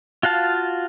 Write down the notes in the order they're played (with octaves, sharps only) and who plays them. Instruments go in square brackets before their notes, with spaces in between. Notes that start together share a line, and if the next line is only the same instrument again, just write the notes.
[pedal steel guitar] F4 F#4 F5 A5